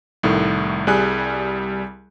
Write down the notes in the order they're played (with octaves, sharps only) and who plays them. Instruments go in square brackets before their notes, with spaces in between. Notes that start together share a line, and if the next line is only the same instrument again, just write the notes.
[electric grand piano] C2 A2 D#3 A3
C2 G3 G#4 G#5 F#6